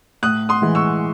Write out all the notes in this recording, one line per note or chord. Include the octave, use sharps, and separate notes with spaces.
A2 D#6 F#6
C6 D#6
E3 G#3
C#6 E6